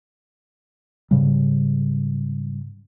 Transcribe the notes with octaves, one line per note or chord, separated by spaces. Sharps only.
G#2 C#3 G3